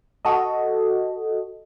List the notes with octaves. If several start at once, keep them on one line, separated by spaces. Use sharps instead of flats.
F#4 A4 D#5